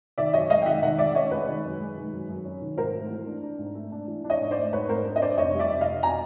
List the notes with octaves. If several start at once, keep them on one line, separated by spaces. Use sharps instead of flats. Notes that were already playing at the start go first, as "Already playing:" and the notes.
D#3 D5 E5
F#2 C#5 D#5
G#3 D#5 F5
G5
D#3 E5 F#5
D#3 E5 F#5
G#3 D5 E5
C#4 C#5 D#5
G#3 B4 C#5
D#3
F#2
G#3
D#3
F#2
F#2
C#4
D#3
G#2 A#4 C5
A3
E3
D4
D4
G#2
A3
D4
E3
D4
C#5 D#5
G#2
C5 D5
A3
G#2 B4 C#5
G#2 A#4 C5
D4
D#5
D4 C5 D5
F1 C#5 D#5
G3
D5 E5
F1
D#5 F5
F1
B2 G#5 A#5